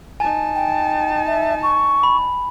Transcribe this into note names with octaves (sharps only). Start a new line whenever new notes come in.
D#4 G#5 A5
G5
E5
C#6
B5